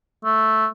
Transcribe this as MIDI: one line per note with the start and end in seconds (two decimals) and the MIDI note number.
0.25 0.67 57